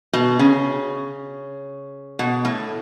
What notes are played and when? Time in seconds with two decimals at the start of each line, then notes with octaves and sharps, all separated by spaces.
0.13 B2
0.39 C#3
2.19 B2
2.45 A2